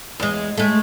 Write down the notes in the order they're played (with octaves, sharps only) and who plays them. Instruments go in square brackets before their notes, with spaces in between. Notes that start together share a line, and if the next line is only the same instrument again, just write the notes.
[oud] E2 G#3
G#3 A3